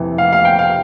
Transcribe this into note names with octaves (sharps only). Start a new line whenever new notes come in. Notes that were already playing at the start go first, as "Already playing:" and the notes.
Already playing: F2 C3 E3
F5
F5
G5
F5